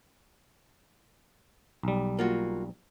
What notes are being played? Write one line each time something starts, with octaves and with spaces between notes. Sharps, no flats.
B1 G3
A#3 F4 F#4